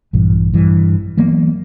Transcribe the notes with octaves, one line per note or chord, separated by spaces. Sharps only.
A#1 G2 E3
G2 E3
E3 F#3 A#3 B3